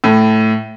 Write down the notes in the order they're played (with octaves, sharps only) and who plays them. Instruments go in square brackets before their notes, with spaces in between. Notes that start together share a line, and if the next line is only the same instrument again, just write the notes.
[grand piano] A2